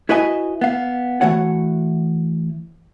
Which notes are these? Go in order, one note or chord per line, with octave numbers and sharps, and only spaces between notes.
E4 F#4 B4 D#5 E5 G#5
B3 F5
E3 A3 F#4 C#5 F#5